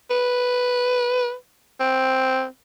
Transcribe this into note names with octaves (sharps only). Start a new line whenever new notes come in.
B4
C4